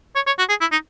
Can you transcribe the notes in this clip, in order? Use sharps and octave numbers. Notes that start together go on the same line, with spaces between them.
C#5
C#5
F#4
G#4
E4
D#4